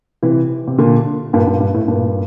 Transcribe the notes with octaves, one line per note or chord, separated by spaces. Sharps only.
C3 E3
C3
A#2 D3
G2 A#2
G2 A#2
G2
A2
G2 A#2